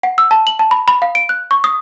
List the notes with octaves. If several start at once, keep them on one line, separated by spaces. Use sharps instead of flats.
F#5
E6
A5
F#7
A5
B5
B5
F5
D7
F#6
C#6
D#6